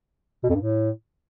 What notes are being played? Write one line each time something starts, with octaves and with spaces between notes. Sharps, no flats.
B2
F2
G2
A2